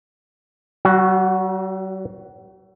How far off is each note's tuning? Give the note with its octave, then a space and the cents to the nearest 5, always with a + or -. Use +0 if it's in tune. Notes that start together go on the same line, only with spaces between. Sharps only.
F#3 +45 F#4 +0